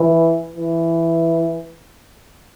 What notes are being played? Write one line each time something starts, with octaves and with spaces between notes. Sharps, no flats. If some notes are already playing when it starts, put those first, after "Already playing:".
Already playing: E3
E3